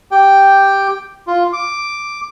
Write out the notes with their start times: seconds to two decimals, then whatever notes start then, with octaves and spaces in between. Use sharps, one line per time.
0.11 G4 G5
1.27 F4
1.53 D6